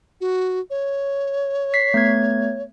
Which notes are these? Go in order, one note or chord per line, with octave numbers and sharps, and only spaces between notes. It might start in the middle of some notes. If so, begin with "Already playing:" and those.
F#4
C#5
B6 C7
A3 B3 G#6